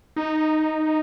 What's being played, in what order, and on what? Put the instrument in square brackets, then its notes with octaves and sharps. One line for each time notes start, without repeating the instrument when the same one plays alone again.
[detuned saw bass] D#4